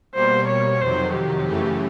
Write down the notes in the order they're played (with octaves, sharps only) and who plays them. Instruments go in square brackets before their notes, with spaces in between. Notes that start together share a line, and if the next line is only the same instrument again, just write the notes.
[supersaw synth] B2 G3 A#3 [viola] C5
[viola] C#5
[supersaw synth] F2 C3 D#3 F#3 [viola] C5
[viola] G4
[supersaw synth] F#2 C#3 E3 A3